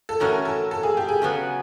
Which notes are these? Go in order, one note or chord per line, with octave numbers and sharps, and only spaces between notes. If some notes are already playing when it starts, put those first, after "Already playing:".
A4
A2 E3 A3 C#4 F#4 A#4
A4
A4
G#4
G4
G#4
C#3 F#3 B3